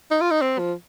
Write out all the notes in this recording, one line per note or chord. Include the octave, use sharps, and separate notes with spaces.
D#4
F4
D#4
C4
F3